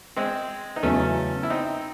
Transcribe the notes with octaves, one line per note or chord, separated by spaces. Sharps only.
G#3 C4
D#4
E2 C#3 F#3 A3 C#4
E4
C4 D#4